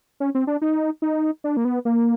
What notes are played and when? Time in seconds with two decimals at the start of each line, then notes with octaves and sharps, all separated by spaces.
0.20 C#4
0.35 C4
0.47 D4
0.62 D#4
1.02 D#4
1.44 D4
1.57 A#3
1.65 B3
1.85 A#3